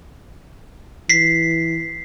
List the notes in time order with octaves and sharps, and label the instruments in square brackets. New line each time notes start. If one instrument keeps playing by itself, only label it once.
[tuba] E3 [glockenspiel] B6 C7